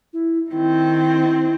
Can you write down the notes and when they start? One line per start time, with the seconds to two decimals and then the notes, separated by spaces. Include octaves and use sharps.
0.13 E4
0.51 D#3 C4 E4